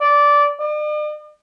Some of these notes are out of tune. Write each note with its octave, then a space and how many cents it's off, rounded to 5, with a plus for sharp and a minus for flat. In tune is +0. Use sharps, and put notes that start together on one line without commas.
D5 -15
D5 +45